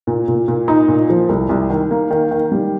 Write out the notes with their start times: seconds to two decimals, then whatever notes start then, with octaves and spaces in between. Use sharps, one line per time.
0.07 A#2
0.28 A#2
0.48 A#2
0.68 D#4
0.88 A#2
1.10 F3
1.29 C2
1.49 C2
1.70 D#3
1.91 A#3
2.11 D#3
2.31 D#3
2.52 G3